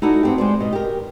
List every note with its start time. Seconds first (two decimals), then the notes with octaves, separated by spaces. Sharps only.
0.02 D#4 E4 F#4 A4 D5
0.23 B3 C4 G4
0.38 G#3 C5 D5
0.60 B2 D#5
0.73 G4 A#4